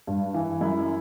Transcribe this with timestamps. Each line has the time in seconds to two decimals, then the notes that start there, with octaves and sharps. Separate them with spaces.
0.07 G2
0.34 E3
0.61 F#2 E4